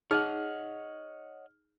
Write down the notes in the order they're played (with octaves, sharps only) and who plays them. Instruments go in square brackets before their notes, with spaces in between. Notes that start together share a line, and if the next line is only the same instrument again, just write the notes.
[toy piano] D#4 G#4 [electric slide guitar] C#5 D#5 F#5 [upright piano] F6